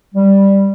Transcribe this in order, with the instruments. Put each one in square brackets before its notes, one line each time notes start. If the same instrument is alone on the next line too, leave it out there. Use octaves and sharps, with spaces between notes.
[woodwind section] G3